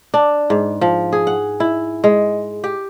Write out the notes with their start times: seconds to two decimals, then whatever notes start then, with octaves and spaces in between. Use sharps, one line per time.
0.14 D4
0.50 G#2
0.81 F3
1.13 G#4
1.27 F#5
1.60 E4
2.04 G#3
2.64 G4